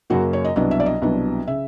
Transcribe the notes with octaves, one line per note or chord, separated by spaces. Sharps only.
F#2 C#3 F#3 A#3 F#4
C#5
D#5
C2 B2 F#3 B3 D4 D#5
E5
D5
D#5
C2 B2 F#3 B3 D4
C#3 E5